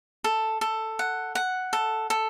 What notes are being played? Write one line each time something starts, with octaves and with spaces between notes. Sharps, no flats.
A4
A4
F#5
F#5
A4
A4